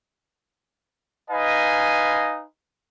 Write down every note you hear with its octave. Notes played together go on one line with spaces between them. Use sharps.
D#4 B4 D#5 F5 G#5